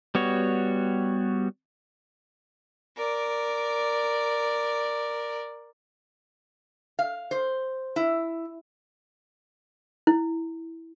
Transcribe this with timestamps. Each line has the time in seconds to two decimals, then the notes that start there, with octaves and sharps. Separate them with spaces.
0.15 G3 B3 F#4 C#5
2.97 A#4 D5
6.99 F5
7.31 C5
7.96 E4
10.07 E4